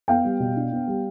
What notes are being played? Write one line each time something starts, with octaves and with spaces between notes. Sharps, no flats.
B3 F5 G5
G3
B2
D4
B3
G3